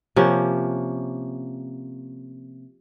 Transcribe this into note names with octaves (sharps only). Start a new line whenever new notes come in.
C3 F3 A#3 C#4